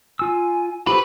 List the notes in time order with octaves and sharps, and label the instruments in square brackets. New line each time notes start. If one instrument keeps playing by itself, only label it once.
[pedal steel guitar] F4 E6 [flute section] G#5
[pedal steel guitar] F4 G4 A4 [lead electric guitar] B4 [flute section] C5 C#6